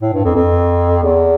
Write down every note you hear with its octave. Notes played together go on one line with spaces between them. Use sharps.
A2
G2
F2
F2
E2